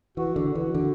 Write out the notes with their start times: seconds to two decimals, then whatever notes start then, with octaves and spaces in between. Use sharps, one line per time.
0.17 E3 F#4
0.36 D3
0.45 F#4
0.55 E3
0.74 D3